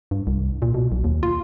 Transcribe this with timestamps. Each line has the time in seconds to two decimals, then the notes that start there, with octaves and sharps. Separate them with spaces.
0.11 G2
0.27 C2
0.62 A#2
0.74 B2
0.92 B1
1.04 D#2
1.23 F4